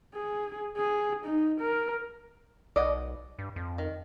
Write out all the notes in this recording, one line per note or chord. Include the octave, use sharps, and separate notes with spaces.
G#4
G#4
D#4
A#4
B1 D5 D#5 F#5
G2
F2
D#3